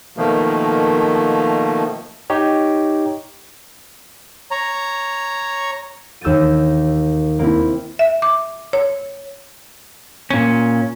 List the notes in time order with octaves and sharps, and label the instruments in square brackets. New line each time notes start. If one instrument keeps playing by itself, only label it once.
[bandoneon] B2 D#3 F3 A3 A#3
[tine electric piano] D#4 G4 C#5
[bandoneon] C#5 A#5
[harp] D#2 E6 G6 A6 D#7
A#3 C4 E4
[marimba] E5
D6
C#5
[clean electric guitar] A#2 C#4